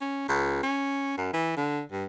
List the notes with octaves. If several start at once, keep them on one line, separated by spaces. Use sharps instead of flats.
C#4
C#2
C#4
F#2
E3
D3
G2